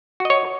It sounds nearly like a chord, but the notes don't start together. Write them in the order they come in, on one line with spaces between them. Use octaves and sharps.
F#4 D#5 C#5